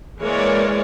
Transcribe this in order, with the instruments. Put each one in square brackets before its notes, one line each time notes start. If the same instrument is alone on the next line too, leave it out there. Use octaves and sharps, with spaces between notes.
[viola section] E3 G#3 A#3 A#4 C#5 D5